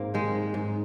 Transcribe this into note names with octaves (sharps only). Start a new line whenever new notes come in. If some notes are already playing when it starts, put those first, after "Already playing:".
Already playing: G#2 A#3 C4
D#3 G#3
G#2